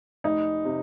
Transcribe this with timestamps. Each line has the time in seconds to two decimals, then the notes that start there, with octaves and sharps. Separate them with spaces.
0.24 F1 D#4
0.65 C3